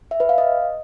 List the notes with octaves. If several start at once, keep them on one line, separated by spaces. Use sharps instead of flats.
E5
B4
F5
D#5